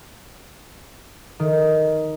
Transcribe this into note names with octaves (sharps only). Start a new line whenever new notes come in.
D#3